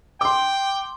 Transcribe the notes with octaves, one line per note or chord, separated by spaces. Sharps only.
G5 C6 D6